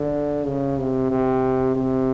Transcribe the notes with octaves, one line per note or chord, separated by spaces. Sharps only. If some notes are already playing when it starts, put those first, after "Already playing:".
Already playing: D3
C#3
C3
C3
C3